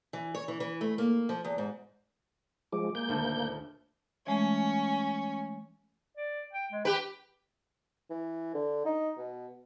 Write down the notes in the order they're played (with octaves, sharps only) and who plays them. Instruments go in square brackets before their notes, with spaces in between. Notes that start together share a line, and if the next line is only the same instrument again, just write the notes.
[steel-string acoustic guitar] E3
C#5
E3
E3
A3
A#3
F3
E2
G#2
[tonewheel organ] F3 G#3 [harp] D6
[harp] G#3 [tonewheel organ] A#3 G6
[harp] D#1 D2 A4
A5
[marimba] E3 G#3 A3 [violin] C#4
[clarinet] D5
G5
G#3
[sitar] G4 B4 [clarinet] G5
[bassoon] E3
D3
D#4
B2